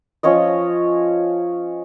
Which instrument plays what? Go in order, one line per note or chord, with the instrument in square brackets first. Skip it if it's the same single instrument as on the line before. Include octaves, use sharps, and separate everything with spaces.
[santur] F3 C#4 C#5 D#5